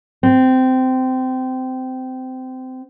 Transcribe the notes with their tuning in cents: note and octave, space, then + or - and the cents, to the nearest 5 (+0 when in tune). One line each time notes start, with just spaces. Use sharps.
C4 -20